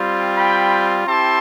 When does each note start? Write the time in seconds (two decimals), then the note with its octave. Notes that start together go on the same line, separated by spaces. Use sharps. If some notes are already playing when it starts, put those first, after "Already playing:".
Already playing: G3 C4 F4
0.37 G5 B5
1.07 C4 E4 G4 A5 C6